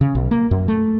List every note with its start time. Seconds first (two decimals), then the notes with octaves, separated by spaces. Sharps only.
0.01 C#3
0.15 B1
0.31 A#3
0.51 F#2
0.68 A3